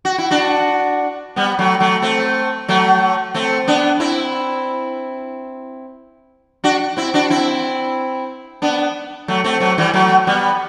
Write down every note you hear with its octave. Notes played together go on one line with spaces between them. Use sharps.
F#4
E4
D4 F#4
G3 B3
F#3 A3
F#3 A3
A3 C4
F#3 A3
A3 C4
B3 D4
C4 E4
D4 F#4
C4 E4
D4 F#4
C4 E4
B3 D4
F#3 A3
A3 C4
F#3 A3
E3 G3
F#3 A3
G3 B3